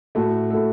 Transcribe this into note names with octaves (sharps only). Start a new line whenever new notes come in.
A2 A3 F#4 A4
A2 A3 F#4 A4